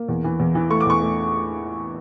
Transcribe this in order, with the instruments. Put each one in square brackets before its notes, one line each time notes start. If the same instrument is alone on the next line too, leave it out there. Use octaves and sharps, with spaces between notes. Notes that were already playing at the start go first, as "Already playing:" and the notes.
Already playing: [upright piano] A#3
E2
E3
E2
E3
A3 C#6
D6
E2 C#6
A3